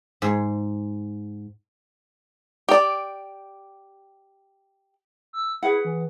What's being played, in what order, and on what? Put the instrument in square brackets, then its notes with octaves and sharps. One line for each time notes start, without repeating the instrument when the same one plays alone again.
[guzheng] G#2
[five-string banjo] G4 D5
[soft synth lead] E6
[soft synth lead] E4 [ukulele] G#4 B4 F#5
[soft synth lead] E3